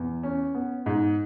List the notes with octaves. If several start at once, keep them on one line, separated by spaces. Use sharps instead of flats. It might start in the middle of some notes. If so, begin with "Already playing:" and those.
Already playing: E2
C#4
B3
G#2